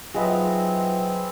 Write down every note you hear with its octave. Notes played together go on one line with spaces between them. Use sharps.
F#3 B3 C4 D#4 F4 G#4 D#5 E5